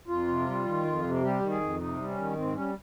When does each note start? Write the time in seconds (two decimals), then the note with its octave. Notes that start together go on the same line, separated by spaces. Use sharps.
0.08 F2 F4
0.28 C3
0.46 G3
0.65 D#3
0.85 F2
1.03 C3
1.22 G3 G4
1.41 D#3
1.50 G#4
1.60 F2
1.80 C3 D#4
1.97 G3
2.08 C#4
2.17 D#3
2.36 G#2 C4
2.54 G3 C#4